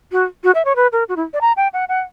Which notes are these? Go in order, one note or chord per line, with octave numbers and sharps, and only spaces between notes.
F#4
F#4
E5
C#5
B4
A#4
F#4
E4
D5
A#5
G5
F#5
F#5